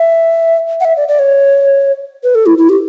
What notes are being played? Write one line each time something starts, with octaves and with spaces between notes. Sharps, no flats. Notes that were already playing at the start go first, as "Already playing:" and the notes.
Already playing: E5
F#5
E5
D5
D5
C#5
B4
A4
E4
E4
G4